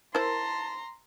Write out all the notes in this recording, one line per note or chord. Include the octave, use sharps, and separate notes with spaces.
E4 A#4 C5 A5 A#5 C6